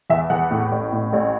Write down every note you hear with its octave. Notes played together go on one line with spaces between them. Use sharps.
E2 E5
E2 F#5
A2
A1
A2
A1